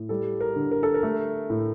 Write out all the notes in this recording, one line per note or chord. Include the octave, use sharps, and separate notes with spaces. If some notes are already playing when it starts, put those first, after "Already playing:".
Already playing: A2
G3 A4
A#4
D3
A#4
A4
A#4
A3
A2